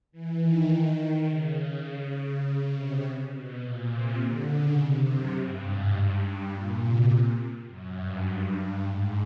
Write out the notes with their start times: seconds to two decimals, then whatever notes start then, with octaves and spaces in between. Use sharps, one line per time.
0.12 E3
0.41 D#3
1.28 C#3
1.57 C#3
1.86 C#3
2.74 C3
3.32 B2
3.61 A#2
3.90 C3
4.20 D3
4.49 C#3
4.77 C3
5.07 F#2
5.35 G2
5.65 G#2
5.94 G2
6.52 A#2
6.80 C3
7.68 F#2
7.97 G2
8.84 G#2